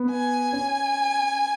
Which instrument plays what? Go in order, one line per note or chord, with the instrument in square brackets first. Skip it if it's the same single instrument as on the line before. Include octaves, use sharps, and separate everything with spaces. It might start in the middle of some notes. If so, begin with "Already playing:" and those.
Already playing: [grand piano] B3
[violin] G#5
[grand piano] C#4